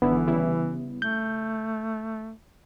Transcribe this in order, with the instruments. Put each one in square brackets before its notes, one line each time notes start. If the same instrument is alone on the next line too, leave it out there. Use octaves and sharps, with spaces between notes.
[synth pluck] G#1 D3 E4 [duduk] E3 [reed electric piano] B3
[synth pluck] C#3 G3 E4
[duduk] A3 [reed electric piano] G6